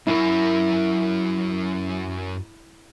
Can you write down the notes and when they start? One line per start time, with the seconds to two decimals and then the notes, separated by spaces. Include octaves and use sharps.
0.07 F#2 E4 A#4